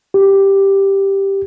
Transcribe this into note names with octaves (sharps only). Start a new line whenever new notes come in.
G4